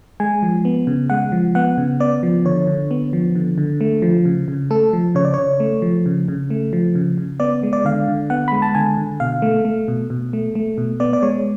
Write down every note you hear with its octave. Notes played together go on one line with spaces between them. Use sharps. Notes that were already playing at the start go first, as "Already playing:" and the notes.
G#3 G#5
F3
B3
C#3
G#3 F#5
F3
B3 F#5
C#3
B3 D5
F3
D3 C#5
D3
B3
F3
D3
D3
A3
F3
C#3
C#3
A3 A4
F3
C#3 C#5
D5
C#3 C#5
A3
F3
C#3
C#3
A3
F3
C#3
C#3
B3 D5
G#3
D5
D3 F5
D3
B3 F#5
G#3 B5
A5
D3 G#5
D3
B2 F5
A3
A3
B2
B2
A3
A3
B2
B3 D5
D5
G#3 C#5